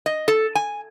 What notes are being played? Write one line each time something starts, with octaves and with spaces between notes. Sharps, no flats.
D#5
A4
G#5